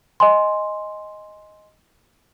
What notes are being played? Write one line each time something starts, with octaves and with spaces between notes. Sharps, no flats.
D#5 G#5 C6